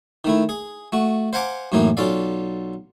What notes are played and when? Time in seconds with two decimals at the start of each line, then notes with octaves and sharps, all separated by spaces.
0.25 D#3 A3 E4
0.49 G#4
0.92 A3 F#4
1.33 C5 F5 F#5 G#5 A#5 D6
1.72 F#2 A2 E3 A#3 D#4
1.97 B1 C#4 F4 A4 D5 F5